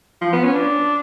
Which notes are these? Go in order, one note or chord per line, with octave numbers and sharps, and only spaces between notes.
F3
B3
C#4
D4